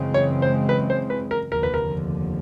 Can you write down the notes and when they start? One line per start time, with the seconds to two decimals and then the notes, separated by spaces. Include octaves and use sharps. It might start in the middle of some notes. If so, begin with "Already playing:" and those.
Already playing: F#2 C#3 E3 G#3 C4
0.14 C#5
0.42 C5
0.69 B4
0.90 C5
1.10 B4
1.31 A#4
1.51 F1 D#2 D3 F3 A#4
1.63 B4
1.74 A#4